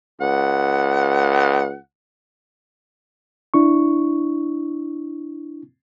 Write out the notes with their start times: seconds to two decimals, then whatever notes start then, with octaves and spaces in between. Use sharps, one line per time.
0.21 C#2 F#5
3.54 D4 E4 C#6